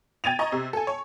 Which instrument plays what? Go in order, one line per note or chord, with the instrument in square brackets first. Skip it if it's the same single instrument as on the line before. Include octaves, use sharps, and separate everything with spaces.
[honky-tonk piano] G5 G#6 A6 D#7 F7
D#5 A#5 C#6
C3
A4 G#5
C#5